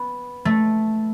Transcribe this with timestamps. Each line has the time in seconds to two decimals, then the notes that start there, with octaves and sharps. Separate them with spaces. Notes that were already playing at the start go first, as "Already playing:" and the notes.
Already playing: B3
0.45 A3